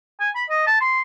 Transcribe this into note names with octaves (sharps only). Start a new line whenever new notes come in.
G#5
B5
D#5
A5
C6